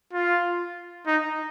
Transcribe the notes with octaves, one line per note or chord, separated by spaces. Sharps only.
F4
D#4